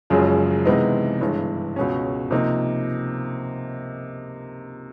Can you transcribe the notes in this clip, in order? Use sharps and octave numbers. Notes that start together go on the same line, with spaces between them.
F#1 F#2 C#3 F3 G#3
C3 E3 G#3 B3 D#4
G1 G2 E3 G#3
C#2 B2 G#3 C#4
C3 F3 A#3 D#4